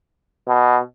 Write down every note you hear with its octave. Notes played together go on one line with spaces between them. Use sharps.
B2